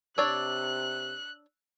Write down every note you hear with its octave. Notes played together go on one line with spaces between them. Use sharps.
C3 D4 C#5 D5 E6 F#6